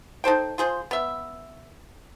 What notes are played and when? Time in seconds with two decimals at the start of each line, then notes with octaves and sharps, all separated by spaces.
0.24 D#4 A4 C5 G5
0.58 F4 G#4 C5
0.91 B3 E5